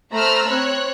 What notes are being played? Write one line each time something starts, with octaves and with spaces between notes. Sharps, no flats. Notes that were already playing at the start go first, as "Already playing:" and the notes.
A3 C5 A#5 B5 E6 F6
C4 C#5 F#6